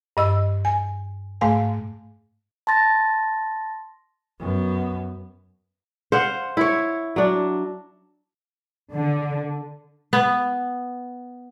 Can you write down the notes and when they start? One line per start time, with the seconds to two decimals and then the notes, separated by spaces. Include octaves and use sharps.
0.17 G2 D#5 E6
0.65 G#5
1.41 G#2 A3 F5 G#5
2.67 A5 C6 A6 A#6
4.39 F#2 B3
6.12 C5 F5 F#5
6.57 E4 C#5
7.16 F#3 D4
8.92 D3
10.13 B3